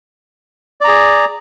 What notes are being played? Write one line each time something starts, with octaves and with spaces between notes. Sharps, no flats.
G#4 D5 A#5